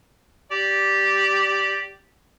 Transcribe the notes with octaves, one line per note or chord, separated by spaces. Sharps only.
G4 D5